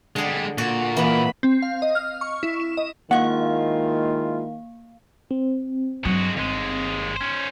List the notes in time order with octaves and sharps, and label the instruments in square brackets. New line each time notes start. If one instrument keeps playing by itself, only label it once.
[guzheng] D3 G#4 [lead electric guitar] G3 G#3
[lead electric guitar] A#2 [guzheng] F#4
[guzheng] E3 B3 [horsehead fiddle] A#3 B5
[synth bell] C4
F5
D#5
F6
C#6
E4
E7
D#5
[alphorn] D#3 [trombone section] G#3 E4 F4 [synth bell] A#3 F5 [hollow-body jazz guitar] F#5
[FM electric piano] C4
[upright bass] G2 F#3 [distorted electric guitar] G#3 F#4
[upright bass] G1 [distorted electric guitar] D#2 G#3
[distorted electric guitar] C#4 C5